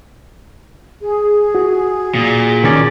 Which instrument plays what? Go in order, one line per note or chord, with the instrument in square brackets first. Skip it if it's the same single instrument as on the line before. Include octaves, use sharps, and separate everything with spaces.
[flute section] G#4
[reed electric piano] F#4
[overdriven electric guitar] A#2
[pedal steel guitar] D#3 C#4 D5